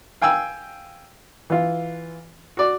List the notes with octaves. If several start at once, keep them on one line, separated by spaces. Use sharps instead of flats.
F5 G5 G#5 E6
E3 F4
F#4 D5